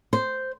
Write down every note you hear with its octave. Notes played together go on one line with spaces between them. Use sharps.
C5